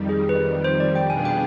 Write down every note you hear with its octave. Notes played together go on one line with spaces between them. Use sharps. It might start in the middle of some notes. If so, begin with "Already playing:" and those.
Already playing: F2 D#3 G3
G#4
B4
C5
D5
G5
B2 B3 D4 F4 G#4 G#5
G5